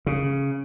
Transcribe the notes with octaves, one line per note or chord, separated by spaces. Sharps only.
C#3